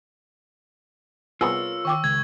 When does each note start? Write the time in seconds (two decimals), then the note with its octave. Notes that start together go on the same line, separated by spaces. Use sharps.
1.41 C2 B3 F4 G#4 A#4 C#5 E6
1.85 D#3 G5 C#6 D6
2.04 C#2 G#6